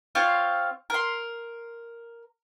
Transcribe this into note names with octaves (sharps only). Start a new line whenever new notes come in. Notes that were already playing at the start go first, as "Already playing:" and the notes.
C4 F4 C#5 F5
A#4 C6